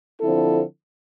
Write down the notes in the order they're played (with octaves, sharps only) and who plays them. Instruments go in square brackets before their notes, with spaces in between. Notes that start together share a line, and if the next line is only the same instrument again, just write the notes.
[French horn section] D3 F3 C4 E4 A4